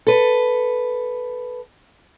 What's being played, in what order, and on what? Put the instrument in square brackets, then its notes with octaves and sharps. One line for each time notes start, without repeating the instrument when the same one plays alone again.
[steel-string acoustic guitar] A4 B4